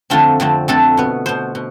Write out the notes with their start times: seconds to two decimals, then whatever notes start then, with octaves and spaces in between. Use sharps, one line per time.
0.10 F2 D3 A3 C4 F4
0.40 F2 D3 A3 C4
0.68 F2 D3 A3 C4 A4
0.97 B2 B3
1.26 B2 B3 C5
1.55 B2